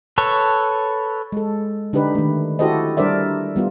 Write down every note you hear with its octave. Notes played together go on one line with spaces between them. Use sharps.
A4 B4 C#5
G#3 A4
D3 D4 D#4 G4 B4
D#3 A3
E4 F#4 G4 A4 C5 D#5
G3 D4 A#4 C5 D5 E5
G3 B3 F4